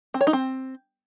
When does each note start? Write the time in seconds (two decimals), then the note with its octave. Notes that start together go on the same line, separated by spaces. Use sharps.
0.14 C4
0.21 C#5
0.27 D#4
0.33 C4